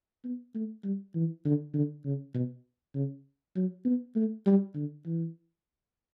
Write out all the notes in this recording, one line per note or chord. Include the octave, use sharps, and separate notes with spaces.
B3
A3
G3
E3
D3
D3
C#3
B2
C#3
F#3
B3
A3
G3
D3
E3